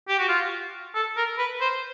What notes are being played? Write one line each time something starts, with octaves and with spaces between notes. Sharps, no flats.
G4
F#4
F4
A4
A#4
B4
C5